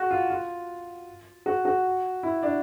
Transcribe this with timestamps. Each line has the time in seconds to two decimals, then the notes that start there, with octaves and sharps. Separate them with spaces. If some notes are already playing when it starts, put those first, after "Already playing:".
Already playing: F#4
0.11 F4
0.30 F4
1.46 F#4
1.65 F#4
2.23 E4
2.43 D4